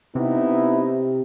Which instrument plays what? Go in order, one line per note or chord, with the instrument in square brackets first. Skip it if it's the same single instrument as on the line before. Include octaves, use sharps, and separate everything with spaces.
[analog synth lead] C3 [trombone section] B3 D#4 E4